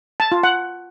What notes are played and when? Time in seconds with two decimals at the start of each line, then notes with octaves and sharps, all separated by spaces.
0.20 A5
0.32 F4
0.43 F#5